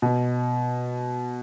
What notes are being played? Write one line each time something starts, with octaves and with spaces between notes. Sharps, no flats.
B2